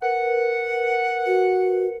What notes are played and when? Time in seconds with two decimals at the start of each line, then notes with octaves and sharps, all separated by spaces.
0.02 A#4 B4 F#5
1.27 F#4